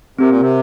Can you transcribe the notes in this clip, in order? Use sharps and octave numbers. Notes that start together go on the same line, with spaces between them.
C3 C4 G4 A#4
A#2
C3